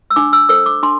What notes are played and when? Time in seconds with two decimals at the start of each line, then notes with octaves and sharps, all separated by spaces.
0.10 E6
0.16 D4 D6
0.33 E6
0.49 A4 C5 E6
0.66 D6
0.83 D4 C6